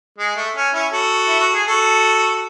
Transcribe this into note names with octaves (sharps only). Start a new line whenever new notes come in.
G#3
A3
C#4
C#4 E4
F#4 A4
E4
F#4
G#4
F#4 A4